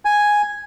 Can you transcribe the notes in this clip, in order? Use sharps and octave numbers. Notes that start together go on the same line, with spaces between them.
G#5